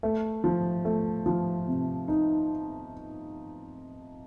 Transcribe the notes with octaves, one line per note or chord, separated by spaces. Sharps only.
A3
F3
A3
F3
C3
D#4